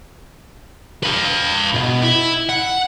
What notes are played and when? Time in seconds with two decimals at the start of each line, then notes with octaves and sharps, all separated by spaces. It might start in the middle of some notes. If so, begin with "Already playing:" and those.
1.03 B4 F5
1.74 B1 B2
2.02 E4
2.49 F#5